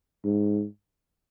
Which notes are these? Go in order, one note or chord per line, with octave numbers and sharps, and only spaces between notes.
G#2